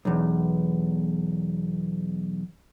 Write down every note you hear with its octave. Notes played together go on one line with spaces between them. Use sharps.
B1 E2